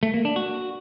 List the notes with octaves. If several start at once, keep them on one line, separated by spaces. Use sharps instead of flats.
A3
A#3
D4
F#4